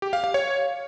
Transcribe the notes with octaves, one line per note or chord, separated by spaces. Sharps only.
G4
F5
F5
C#5